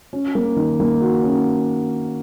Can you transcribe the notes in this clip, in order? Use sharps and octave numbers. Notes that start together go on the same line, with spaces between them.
C#4
A#3
D#3
A#3
F#4
C#4